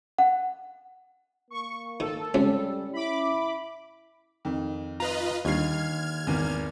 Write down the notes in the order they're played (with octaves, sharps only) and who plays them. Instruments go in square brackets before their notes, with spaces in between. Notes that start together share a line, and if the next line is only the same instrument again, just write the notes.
[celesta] F#5
[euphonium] A#3 [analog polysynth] C#6
[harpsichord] D#3 [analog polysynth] A4
[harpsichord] C#2 C3 [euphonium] G3 [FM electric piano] C#4
[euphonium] E4 [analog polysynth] B5 D6
[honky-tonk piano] F2 D#3
[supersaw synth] F4 B4 D#5 [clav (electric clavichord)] A#5
[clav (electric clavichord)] D#2 [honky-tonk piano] D3 G3 C7 [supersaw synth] F6 G#6
[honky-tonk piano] G#1 E2